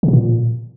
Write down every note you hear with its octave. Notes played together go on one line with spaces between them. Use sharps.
C#3
B2
A#2